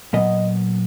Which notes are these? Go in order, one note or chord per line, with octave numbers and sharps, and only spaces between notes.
A#2 F#3 B3 D#5